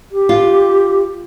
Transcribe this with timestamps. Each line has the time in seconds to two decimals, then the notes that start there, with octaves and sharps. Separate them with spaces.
0.12 G4
0.29 F4